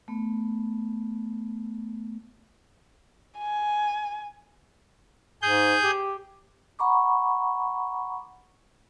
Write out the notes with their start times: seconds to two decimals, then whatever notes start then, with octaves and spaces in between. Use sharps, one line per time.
0.08 A3 B3
3.38 G#5
5.42 G#2 G#4 G6
5.83 G4
6.79 F#5 A#5 B5 C#6 D6